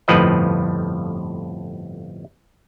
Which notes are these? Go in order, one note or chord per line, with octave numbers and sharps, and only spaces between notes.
G1 F2 A2 F3 B4 D#5